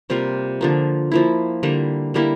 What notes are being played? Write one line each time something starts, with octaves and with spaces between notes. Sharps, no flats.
C3 G3 A#3 F4
D3 F3 A#3
F3 A#3 E4
D3 G3 A#3
D3 G3 A#3 E4